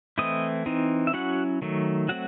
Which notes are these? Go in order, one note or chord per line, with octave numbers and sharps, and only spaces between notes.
E3 A3 C4 E4 D#5 D#6
E3 C4 D#4
E5
F#3 C#4 E4 F#4 F#5
D#3 F#3 A3
F#3 A3 C4 F#4 F#5